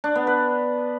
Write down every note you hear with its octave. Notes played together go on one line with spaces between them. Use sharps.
D4
B3
B4